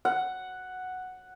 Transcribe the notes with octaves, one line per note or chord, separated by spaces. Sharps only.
F#5